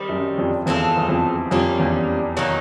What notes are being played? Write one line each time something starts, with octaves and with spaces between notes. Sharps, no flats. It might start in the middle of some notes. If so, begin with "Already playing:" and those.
Already playing: D#3 G3 C4
F#2
F2
E2 G#3 C4 F4 A4
E2
F2
F2 G3 A#3 C#4 F4
E2
D#3 F#3 A#3 D#4